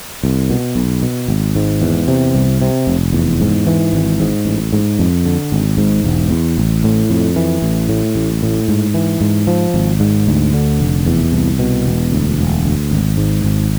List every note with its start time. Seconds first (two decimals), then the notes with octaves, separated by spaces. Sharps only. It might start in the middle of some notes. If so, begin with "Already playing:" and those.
0.23 C2
0.50 B2
0.75 B1
1.02 B2
1.28 G#1
1.56 G#2
1.82 E2
2.08 C3
2.35 C2
2.61 C3
2.87 F1
3.13 E2
3.41 G#2
3.67 E3
3.93 G#1
4.20 G#2
4.45 A1
4.72 G#2
4.99 F2
5.25 D3
5.52 G#1
5.77 G#2
6.04 E1
6.30 E2
6.58 A1
6.84 A2
7.10 F2
7.36 E3
7.62 A1
7.89 A2
8.15 A1
8.43 A2
8.68 G#2
8.94 E3
9.21 G#2
9.47 F3
9.74 G#1
10.00 G#2
10.27 D2
10.54 D3
10.80 F1
11.06 E2
11.32 C2
11.59 B2
11.86 E1
12.12 D2
12.38 E1
12.64 D2
12.91 G#1
13.17 G#2
13.44 G#1